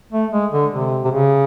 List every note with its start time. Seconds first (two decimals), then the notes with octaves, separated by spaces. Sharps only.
0.12 A3
0.32 G#3
0.52 D3
0.71 C3
1.05 C3
1.11 C#3